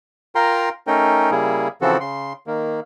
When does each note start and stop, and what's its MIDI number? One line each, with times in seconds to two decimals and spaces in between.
0.35 0.69 65
0.35 0.69 70
0.35 0.69 79
0.35 0.69 82
0.35 0.69 84
0.87 1.31 57
0.87 1.31 61
0.87 1.31 63
0.87 1.31 70
0.87 1.31 79
1.31 1.68 49
1.31 1.68 55
1.31 1.68 58
1.31 1.68 64
1.31 1.68 68
1.81 1.98 49
1.81 1.98 52
1.81 1.98 53
1.81 1.98 60
1.81 1.98 66
1.81 1.98 69
2.01 2.33 49
2.01 2.33 84
2.47 2.80 51
2.47 2.80 58